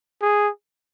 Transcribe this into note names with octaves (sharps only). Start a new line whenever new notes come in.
G#4